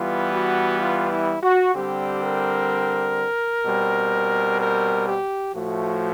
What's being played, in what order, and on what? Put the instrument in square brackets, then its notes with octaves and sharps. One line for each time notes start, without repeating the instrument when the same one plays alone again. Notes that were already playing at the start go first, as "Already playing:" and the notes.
Already playing: [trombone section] E3 G3 B3 F4
F#4
F4
E4
F#4
D3 G3 C4 G4
A#4
B2 G3 C4
A#4
G4
A2 F3 A3 F#4